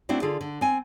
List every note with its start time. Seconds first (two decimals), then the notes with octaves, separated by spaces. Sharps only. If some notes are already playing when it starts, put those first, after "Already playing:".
0.09 A3 C4 D4 E4 F#4
0.22 D3 F4 G#4 A4
0.41 D3
0.61 C4 G#5